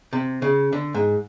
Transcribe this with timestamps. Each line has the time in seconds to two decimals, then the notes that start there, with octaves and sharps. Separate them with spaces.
0.13 C3
0.42 C#3
0.73 D3
0.94 G#2